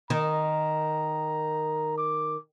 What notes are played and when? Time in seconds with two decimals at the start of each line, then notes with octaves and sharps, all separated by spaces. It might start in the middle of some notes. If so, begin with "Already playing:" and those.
0.10 D#3 A#5
1.98 D6